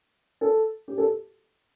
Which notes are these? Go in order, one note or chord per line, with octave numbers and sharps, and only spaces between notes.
A4
G4
A4